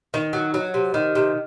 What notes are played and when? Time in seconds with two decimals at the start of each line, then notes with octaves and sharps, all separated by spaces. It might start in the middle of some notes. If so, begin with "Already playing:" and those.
0.14 D#3
0.33 F#3
0.54 F#3
0.74 C3
0.94 D#3
1.15 C3